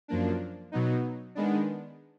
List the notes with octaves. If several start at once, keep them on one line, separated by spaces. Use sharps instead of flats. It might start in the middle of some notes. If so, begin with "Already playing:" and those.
F#2 F3 A#3 D4
B2 F#3 B3 D#4
D#3 G#3 B3 D4